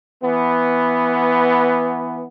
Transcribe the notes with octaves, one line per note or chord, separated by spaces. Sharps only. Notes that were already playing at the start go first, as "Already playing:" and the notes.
E3 B3